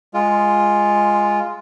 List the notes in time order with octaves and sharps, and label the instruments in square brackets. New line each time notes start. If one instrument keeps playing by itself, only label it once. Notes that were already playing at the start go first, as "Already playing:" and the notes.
[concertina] G#3 F4